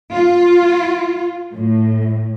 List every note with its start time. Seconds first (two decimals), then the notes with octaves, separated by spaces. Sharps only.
0.15 F4
1.55 A2